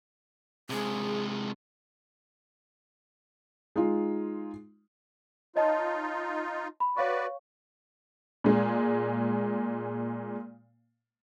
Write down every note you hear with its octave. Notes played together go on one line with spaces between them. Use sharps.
C3 G#3 G#4
G#3 D#4 F4
D#4 F4 C#5 D#5 A5
B5
F#4 B4 C#5 D5 F5 C#6
A#2 G#3